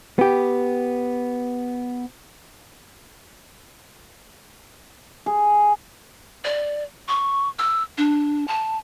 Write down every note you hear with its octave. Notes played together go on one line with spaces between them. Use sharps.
B3 G4
G#4
D5
C#6
E6
D4
A5